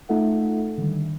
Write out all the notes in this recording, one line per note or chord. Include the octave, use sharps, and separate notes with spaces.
A3 D#4 F4 A4 E5 F#5
D3 D#3 G3